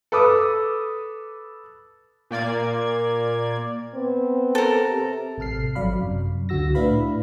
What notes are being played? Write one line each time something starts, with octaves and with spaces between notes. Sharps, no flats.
A4 B4 D6 D#6
A#2 A#3 D5 G#6
B3 C4
A4 A#4
C3
A1 C3 A4 F6 C7
G#1 F#3 D5 F5 B5
F#2 C3
C#2 D3 F#4 E6 A#6
A2 D4 E4 B4 F5 B5